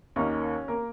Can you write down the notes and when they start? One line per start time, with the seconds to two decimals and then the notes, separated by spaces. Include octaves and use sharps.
0.16 D#2 D#3 A#3 C#4 D#4 C#5
0.68 A#3 A#4